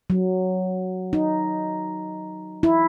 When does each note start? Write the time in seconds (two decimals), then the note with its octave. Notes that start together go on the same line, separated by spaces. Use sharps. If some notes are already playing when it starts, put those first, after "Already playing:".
0.10 F#3
1.13 D#4
2.63 E4